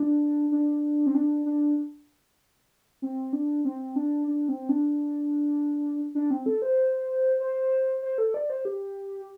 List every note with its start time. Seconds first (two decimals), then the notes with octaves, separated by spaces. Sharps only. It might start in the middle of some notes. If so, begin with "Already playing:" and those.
Already playing: D4
0.52 D4
1.06 C4
1.15 D4
1.46 D4
3.02 C4
3.33 D4
3.65 C4
3.96 D4
4.27 D4
4.49 C4
4.69 D4
6.15 D4
6.31 C4
6.46 A4
6.62 C5
7.40 C5
8.02 C5
8.18 A4
8.34 D5
8.50 C5
8.65 G4